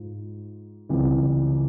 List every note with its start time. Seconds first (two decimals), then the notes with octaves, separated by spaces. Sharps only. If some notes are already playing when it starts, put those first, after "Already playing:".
Already playing: G#2 F4
0.89 C#2 C3 E3 G3